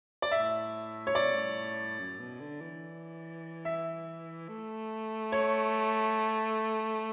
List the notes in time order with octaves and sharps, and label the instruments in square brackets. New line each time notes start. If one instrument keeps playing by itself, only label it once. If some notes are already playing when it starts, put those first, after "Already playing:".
[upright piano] D5
[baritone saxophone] A2 [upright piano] E5
[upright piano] C#5
[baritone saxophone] A2 [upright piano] D5
[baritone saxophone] B2
A2
F#2
B2
D3
E3
[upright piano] E5
[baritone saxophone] A3
[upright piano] C#5